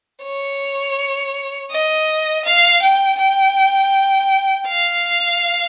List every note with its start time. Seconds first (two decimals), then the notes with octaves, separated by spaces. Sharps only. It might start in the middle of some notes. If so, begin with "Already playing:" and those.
0.23 C#5
1.71 D#5
2.45 F5
2.83 G5
3.19 G5
4.68 F5